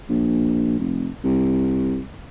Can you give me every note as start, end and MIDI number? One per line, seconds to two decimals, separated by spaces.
0.09 0.75 34
0.79 1.09 29
1.24 2.02 36